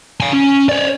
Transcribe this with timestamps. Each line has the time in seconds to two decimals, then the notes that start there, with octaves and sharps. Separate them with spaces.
0.20 F5 G#5
0.33 C#4
0.69 C#5 D5